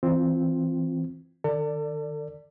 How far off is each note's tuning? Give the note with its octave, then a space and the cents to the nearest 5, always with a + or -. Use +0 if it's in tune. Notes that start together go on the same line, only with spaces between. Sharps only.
E3 +0 C4 +0 F4 +0
D#3 -35 A4 +35 D5 +0